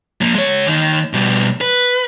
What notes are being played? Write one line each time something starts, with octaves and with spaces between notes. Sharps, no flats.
F3 A#3
G#3 C#5
D#2 D#3
B2 G3
B4